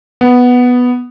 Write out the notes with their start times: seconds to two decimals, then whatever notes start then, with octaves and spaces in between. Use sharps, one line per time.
0.21 B3